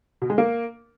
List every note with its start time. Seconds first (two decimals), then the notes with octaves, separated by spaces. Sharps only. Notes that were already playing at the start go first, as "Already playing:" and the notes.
0.22 B2
0.30 G#3
0.38 A#3